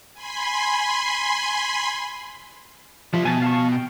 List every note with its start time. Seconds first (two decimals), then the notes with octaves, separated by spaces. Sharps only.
0.14 G#5 B5 C6
3.14 F3 G3 E5
3.25 B2 G#5 A5
3.42 F5 A5 C#6
3.72 G5